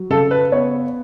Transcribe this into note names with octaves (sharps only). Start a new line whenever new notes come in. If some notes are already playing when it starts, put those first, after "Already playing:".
Already playing: F#3
C#3 A4
B4
B3 C#5